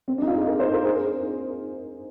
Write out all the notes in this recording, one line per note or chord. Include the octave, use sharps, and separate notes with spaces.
C4
D4 D#4
F4
G#4
A#4
C5
A#4
G#4